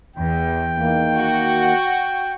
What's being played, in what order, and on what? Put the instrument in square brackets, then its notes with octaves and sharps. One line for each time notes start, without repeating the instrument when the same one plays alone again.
[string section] E2 [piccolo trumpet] G5
[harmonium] D#3 A#3
[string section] F#4